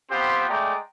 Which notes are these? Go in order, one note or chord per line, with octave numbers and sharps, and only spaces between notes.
B3 C4 F4 G4 C5
G#3 A3 D5 G5 A#5